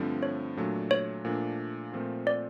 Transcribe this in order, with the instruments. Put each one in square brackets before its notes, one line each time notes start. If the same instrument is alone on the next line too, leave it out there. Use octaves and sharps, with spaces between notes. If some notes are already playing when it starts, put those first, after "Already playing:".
Already playing: [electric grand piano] G2 D3 F3 A3 C4
[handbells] C#5
[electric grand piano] A#2 F#3 A3 D4
[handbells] C#5
[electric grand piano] A#2 F3 A3 D4
A#2 F3 A3 C4 F4
[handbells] D5